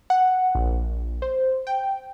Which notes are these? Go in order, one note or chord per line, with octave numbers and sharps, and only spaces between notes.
F#5
A#1
C5
G5